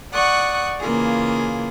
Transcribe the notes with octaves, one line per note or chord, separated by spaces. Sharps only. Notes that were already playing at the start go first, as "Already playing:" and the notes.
D5 F#5 C#6 D#6 F#6
C#3 E3 A#3 F4 G#4